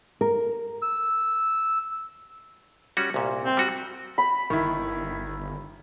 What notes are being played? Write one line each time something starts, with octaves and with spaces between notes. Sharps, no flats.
A#4
E6
G3 C#4 F#4
C2 A#2
C4
G3 F#4
B5
G1 D#3 E4